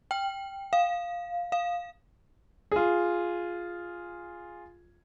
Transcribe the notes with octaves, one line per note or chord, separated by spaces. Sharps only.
G5
F5
F5
F4 G#4